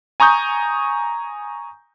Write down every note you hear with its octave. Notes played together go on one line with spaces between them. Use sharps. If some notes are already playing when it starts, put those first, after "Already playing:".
G#5 A#5 C#6 D#6 G6